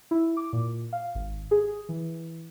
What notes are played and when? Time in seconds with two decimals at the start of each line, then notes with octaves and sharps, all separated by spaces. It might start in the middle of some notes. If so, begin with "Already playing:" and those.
0.11 E4
0.37 D6
0.53 A#2
0.93 F5
1.15 G#1
1.51 G#4
1.89 E3